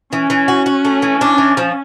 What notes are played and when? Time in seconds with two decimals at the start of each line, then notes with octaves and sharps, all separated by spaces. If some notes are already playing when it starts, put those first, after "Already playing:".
0.12 E3 C#4
0.30 E3
0.48 F#4
0.66 F#4
0.85 A3
1.02 E3
1.21 D4
1.38 E3
1.57 F3